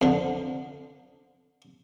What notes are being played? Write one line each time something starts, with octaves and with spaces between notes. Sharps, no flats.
F2 D3